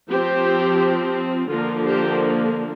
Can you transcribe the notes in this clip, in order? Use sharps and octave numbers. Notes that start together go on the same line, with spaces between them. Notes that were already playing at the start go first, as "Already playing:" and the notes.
F3 C4 G4 C5
D3 F3 A#3 F4 A#4
G4 C5